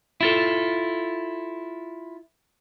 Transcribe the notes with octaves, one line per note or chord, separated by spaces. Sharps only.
E4 F4 A4